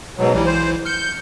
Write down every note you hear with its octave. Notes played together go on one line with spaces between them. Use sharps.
G#2 B2 F#3
B1 E3 G3 E4
C5
F6 G6 C#7